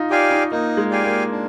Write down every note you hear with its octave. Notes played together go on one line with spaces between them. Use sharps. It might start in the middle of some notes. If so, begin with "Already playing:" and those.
Already playing: D#4 F4
F4 G4 D5 F5 G#5
D#4
A#3 D#4
G#3
G4 D5 F5 G#5
A#3
D4